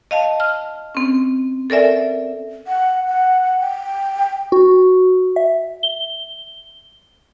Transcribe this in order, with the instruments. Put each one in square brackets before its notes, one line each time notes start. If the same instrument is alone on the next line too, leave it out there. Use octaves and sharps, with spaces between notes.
[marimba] D#5 F5 A5
F6
C4 C#4
A4 A#4 D5 E5 G#5
[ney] F#5
F#5
G5
[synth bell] F#4
E5
G7